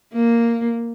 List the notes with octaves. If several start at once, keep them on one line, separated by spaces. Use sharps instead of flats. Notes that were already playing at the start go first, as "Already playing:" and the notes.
A#3